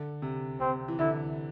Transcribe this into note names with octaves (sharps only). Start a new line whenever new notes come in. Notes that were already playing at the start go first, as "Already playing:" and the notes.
Already playing: D3
C3
C3 C4
E3
D3 E4